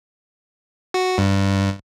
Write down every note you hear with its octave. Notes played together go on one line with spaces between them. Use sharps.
F#4
G2